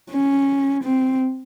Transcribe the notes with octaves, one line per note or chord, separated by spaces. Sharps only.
C#4
C4